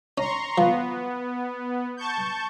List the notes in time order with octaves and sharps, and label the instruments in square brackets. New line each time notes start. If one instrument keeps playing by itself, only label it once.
[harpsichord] C#4 [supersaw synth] A#5 C6 C#6
[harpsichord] F3 [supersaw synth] B3
[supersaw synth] A5 C#6 G6